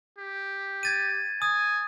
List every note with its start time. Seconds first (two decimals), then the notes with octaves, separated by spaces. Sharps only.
0.19 G4
0.83 G#6 A6 D#7
1.42 G#5 D#6